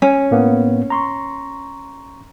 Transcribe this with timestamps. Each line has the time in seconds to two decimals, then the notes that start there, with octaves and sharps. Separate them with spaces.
0.02 C#4
0.31 A2 A#3 B3
0.90 A#5 C6 C#6